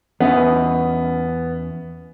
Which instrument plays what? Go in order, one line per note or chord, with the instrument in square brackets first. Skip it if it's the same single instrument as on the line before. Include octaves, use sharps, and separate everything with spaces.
[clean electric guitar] E2 C#4 E5 [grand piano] B3 [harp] B4 D#5